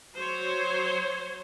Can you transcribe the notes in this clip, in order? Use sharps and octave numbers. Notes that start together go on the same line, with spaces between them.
F#3 C5 C#5